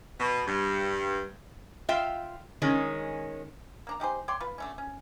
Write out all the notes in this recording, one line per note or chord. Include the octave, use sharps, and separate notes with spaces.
B2
G2
F4 E5 F5 G5
D#3 G#3 C#4
A#3 D4 A#5
D#4 G4 G#4 C5
C#5 D5 G5 C6
F4 B4
D3 A3 C#4
C#4